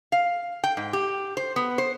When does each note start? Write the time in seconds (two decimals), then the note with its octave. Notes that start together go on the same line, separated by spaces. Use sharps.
0.12 F5
0.64 G5
0.77 G#2
0.93 G4
1.37 C5
1.56 B3
1.78 C5